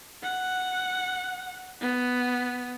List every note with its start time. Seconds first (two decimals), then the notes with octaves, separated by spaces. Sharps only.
0.23 F#5
1.81 B3